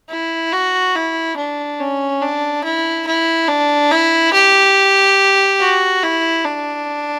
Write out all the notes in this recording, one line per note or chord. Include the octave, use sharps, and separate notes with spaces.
E4
F#4
E4
D4
C#4
D4
E4
E4
D4
E4
G4
F#4
E4
D4